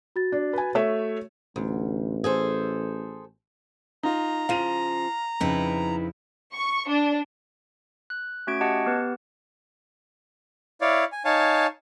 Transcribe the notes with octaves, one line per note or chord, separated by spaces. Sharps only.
F#4 A6
D4
B4 G#5
A3 C#5 E5
A1 D2
G#4 A4 C5
D#4 F4 A#5
C#3 F3 F5 D#7 F7
F2 C#3 D#4 E4 B4
C#6
D4
F#6
A3 C#4 F#4 G#6 D7
G4 D#5 F#5 A5 G#6
B3 G4 B4
E4 C#5 D5 F5
G#5
D#4 C#5 F5 G#5 A5